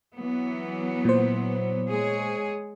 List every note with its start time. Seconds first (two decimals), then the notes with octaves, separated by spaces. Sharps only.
0.16 E3 F#3 B3
1.05 A#2 C5
1.89 G#3 G#4 C#5